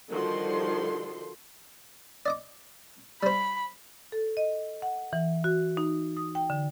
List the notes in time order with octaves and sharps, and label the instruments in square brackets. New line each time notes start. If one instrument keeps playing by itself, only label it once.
[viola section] D3 D#3 F3 G3 F#4 C6
[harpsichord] D5 D#5 D6
[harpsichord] G3 C5 [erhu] B5
[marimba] A4
D#5
F#5
E3
F#4
D#4
D#6
G5
D3